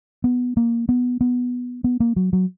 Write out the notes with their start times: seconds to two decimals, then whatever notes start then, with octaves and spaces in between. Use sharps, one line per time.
0.24 B3
0.57 A#3
0.89 B3
1.21 B3
1.84 B3
2.00 A#3
2.16 F#3
2.33 F#3